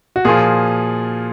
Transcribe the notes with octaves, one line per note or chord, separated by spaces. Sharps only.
F#4
A#2 F3 G#4